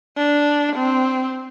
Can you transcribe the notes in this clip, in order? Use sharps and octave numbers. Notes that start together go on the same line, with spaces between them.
D4
C4